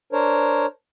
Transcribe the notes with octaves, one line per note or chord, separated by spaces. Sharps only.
D4 A#4 C5 C#5